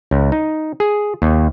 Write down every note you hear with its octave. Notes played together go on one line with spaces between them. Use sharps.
C#2
D#4
G#4
D#2